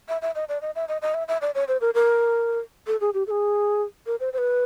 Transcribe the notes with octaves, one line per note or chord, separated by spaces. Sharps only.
E5
E5
D#5
D5
D#5
E5
D#5
D#5
E5
E5
D5
C#5
C5
A#4
A#4
A4
G#4
G4
A4
G#4
A#4
C5
C5
B4